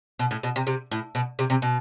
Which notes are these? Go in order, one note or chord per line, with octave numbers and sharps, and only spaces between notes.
B2
A2
B2
C3
C3
A2
B2
C3
C3
B2